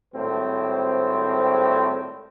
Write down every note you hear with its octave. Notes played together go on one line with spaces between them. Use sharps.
G#1 A2 G3 C4 C5